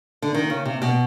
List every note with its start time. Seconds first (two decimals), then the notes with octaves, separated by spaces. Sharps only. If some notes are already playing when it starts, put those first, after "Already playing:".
0.22 D3
0.34 D#3
0.50 C#3
0.65 C3
0.82 B2